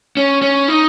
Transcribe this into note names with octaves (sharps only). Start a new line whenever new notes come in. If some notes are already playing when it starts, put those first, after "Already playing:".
C#4
C#4
D#4